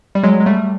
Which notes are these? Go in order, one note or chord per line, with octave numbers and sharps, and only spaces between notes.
G3
F#3 G#3
G#3
G3 A3